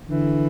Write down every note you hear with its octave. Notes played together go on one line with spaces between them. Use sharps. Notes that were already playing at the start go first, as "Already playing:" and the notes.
D3 E3